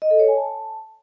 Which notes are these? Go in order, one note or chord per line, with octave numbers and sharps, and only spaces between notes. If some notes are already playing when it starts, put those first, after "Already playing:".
D#5
A4
C#5
G#5
A5